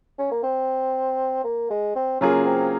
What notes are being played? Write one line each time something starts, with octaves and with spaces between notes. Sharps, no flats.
C#4
A#3
C4
A#3
G#3
C4
C#3 F#3 A#3 C#4 F4 G#4
C4